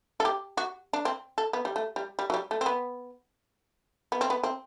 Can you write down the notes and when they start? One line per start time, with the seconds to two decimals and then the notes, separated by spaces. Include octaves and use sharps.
0.20 A4
0.25 G4
0.57 F#4
0.93 D4
1.05 C4
1.38 A4
1.53 B3
1.65 G3
1.76 A3
1.96 G3
2.19 G3
2.30 F#3
2.34 G3
2.51 A3
2.61 C4
2.66 B3
4.12 B3
4.21 C4
4.30 B3
4.43 C4